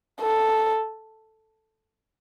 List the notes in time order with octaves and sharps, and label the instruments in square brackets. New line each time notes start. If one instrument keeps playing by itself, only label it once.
[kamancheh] A4